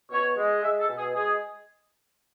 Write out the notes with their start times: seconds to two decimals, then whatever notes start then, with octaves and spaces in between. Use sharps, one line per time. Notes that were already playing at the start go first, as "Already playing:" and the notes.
0.11 B2 C#5
0.37 G#3
0.62 G#3 E5
0.80 A4
0.89 B2
0.98 G#4
1.15 G#3 G#4